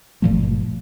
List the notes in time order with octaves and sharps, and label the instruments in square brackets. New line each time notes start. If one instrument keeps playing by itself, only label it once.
[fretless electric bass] G1 A#2 F3 A3